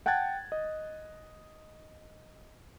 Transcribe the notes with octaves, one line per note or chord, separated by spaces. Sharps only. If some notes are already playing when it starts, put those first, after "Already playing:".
F#5 G5 A5 F#6 G#6 A6
D#5